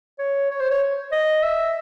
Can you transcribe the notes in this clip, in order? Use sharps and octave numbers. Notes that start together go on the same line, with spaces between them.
C#5
C#5
C5
C#5
D#5
E5